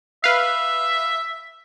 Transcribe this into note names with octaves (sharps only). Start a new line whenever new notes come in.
B4 E5 F5